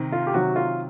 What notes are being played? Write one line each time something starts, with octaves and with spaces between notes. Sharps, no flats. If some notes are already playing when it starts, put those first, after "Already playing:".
Already playing: C3 D#3
F4
G4
C3 D#3 F#3 F#4
F4